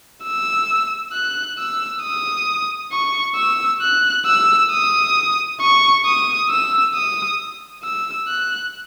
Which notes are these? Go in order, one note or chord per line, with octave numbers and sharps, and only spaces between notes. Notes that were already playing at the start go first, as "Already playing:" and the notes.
E6
F#6
E6
D#6
C#6
E6
F#6
E6
D#6
C#6
D#6
E6
D#6
E6
F#6